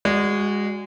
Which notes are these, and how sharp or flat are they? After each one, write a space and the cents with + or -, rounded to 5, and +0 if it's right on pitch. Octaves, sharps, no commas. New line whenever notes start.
G#3 -25 F#4 +0 D5 -10